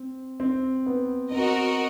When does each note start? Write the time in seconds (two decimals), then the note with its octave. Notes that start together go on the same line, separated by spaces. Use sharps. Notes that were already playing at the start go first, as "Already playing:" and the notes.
Already playing: C4
0.40 C4
0.86 B3
1.32 C4 F#4 A#4 D#5